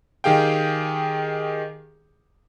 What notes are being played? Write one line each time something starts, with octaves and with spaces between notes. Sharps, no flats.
D#3 G4 G#4 F5 G5